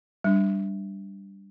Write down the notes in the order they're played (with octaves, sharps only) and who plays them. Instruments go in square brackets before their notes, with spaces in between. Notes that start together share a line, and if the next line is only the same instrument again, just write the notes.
[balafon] G3 D4